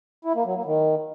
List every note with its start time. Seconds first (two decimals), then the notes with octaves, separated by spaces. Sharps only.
0.25 E4
0.35 A#3
0.45 F#3
0.55 A#3
0.65 D#3